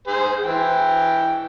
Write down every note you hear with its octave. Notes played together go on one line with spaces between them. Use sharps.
G#4 C5
E3 G5